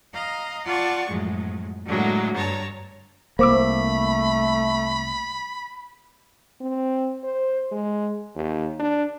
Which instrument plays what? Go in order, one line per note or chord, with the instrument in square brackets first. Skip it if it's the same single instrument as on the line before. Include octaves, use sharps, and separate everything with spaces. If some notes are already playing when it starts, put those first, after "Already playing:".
[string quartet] D#5 F5 A#5
F4 D5 F#5 A5 C#6
F#2 A2 F3 G#3
A2 D3 F#3 G#3 A#3
G2 C#5 A5 A#5
[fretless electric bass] C2 A#3 [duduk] A3 [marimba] C5 D6 E6 [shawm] B5
[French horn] C4
C5
G#3
D#2
D4